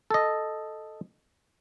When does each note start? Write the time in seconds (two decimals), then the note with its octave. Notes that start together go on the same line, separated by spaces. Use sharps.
0.11 A4 D#5